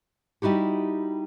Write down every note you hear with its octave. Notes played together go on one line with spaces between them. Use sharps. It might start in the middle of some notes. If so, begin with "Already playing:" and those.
G3 D#4 E4 F#4 G4